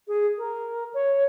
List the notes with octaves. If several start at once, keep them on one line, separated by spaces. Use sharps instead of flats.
G#4
A#4
C#5